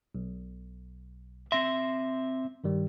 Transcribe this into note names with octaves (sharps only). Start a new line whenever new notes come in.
B1
C4 E5 C6 A#6
G2 D#3 G3